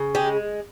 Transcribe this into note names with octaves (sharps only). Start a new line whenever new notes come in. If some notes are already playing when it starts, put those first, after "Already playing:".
Already playing: C#3
G#3 G4